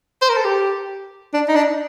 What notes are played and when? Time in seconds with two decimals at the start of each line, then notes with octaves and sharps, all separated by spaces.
0.22 C5
0.29 A#4
0.37 A4
0.45 G4
1.34 D4
1.48 D#4
1.55 D4